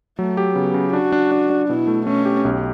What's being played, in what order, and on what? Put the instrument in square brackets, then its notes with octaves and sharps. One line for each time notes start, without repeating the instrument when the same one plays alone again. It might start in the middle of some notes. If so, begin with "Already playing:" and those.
[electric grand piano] F#3 [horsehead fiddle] A3
[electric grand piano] G4
[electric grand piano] C#3 [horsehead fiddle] B3
[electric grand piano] C#3
[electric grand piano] D4 [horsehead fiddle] F#4
[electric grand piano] D4
D4
D4
[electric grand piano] B2 [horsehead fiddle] E4
[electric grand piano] A3
[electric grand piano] A3 [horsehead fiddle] C#4
[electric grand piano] G4
B1